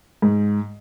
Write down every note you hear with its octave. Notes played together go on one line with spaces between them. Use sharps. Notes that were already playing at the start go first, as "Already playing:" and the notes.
G#2